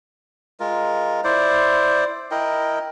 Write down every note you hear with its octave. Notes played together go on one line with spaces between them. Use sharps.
G#3 F4 A#4
E4 C5 D5
E4 A#4 D#5 G5